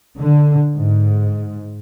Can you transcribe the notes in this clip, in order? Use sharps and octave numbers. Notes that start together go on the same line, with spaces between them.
D3
G#2